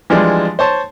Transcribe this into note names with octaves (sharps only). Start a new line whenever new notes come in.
E3 F3 G3 G#3 D4
C5 C#5 A5